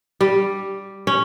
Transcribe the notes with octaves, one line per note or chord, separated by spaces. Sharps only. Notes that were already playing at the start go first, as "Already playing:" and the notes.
G3
C#4